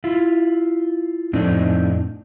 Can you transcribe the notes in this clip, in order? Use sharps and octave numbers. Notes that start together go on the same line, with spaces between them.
E4 F4
F2 A2 C4 D4 D#4